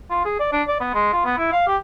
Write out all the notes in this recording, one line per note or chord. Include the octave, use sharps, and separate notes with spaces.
F4
G#4
D5
D4
D5
B3
G#3
F4
B3
E4
F5
G4